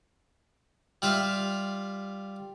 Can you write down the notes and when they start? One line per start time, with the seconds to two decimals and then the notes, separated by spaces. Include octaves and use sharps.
1.02 G3 F4 E5 F5